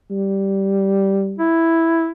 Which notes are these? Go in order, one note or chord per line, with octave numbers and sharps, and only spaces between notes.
G3
E4